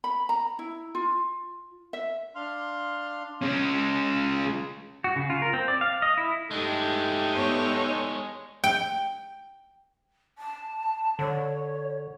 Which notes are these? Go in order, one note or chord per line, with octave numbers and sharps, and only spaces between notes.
B5
A#5
E4
F4
E5
D4 F5 C6 F6
G#3 C#4
F#4
C#3
F4
A#4
C4
D5
F5
D#5
E4
G2 G#3 A3 D4 D#4 G4 A4
B3 C#5
G5
A5
D3 C#5